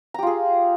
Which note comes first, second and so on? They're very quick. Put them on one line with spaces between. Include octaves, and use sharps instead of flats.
A#5 G4 F4 G#4